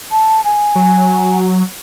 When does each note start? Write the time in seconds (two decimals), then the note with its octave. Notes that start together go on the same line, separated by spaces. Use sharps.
0.11 A5
0.44 G#5
0.75 F#3